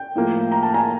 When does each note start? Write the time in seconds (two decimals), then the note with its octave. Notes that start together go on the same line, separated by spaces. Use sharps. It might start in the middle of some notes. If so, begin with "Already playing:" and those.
Already playing: G5
0.16 A2 F3 A#3
0.52 A#5
0.63 A5
0.74 G#5 A#5